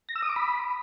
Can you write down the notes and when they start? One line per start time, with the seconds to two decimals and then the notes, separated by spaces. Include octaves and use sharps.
0.09 A#6
0.16 E6
0.22 D#6
0.29 D6
0.36 B5